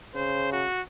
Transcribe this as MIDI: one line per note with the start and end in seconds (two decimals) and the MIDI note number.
0.15 0.66 49
0.15 0.52 72
0.52 0.81 66